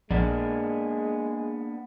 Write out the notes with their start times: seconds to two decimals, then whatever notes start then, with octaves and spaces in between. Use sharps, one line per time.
0.11 A#1 G#3 A#3 B3 D4